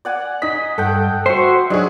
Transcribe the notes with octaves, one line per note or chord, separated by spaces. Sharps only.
D5 F#5 G#5
D#4 D#5 B6
G2 A4 F#5 G5
F#4 C5 E5
F#3 G#3 D4 D#4 G#4